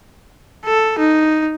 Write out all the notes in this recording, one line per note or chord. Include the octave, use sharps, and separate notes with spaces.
A4
D#4